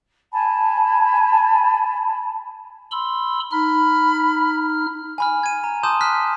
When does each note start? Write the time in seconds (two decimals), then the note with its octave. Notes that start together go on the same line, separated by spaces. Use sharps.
0.31 G#5 A5 B5
2.91 B5 C6 E6
3.51 D#4 B5 F6
5.18 G#5 B5 F6
5.43 G#6 D#7
5.64 A#5
5.83 A5 C6 D6 D#6 G6 E7
6.01 F6 F#6 B6